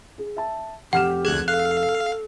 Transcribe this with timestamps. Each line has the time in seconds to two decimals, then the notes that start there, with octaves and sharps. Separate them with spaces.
0.18 G#4
0.37 E5 A5
0.93 F1 G4 F#5 F6 E7
1.25 D2 G#4 F#6 G#6
1.48 A4 F5 F#6